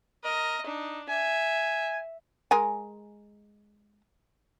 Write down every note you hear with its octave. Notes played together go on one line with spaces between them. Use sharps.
A#4 D#5
D4 D#4
E5 G#5
G#3 A#4 G#5